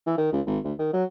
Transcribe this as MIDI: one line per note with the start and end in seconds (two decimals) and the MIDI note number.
0.06 0.17 52
0.18 0.32 51
0.33 0.41 37
0.46 0.59 32
0.64 0.73 38
0.79 0.89 51
0.93 1.04 54